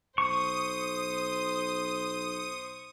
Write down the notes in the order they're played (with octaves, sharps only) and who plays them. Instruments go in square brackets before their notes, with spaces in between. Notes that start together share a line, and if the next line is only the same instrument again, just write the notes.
[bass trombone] B1 [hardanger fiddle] C5 [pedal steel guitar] C#6 [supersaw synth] D#6